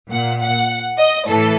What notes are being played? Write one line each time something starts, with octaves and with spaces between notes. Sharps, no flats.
A#2 F#5
F#5
D#5
A2 E3 A4